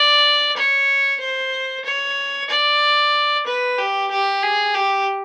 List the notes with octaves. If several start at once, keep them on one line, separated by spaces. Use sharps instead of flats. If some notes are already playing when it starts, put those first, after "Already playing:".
Already playing: D5
C#5
C5
C#5
D5
B4
G4
G4
G#4
G4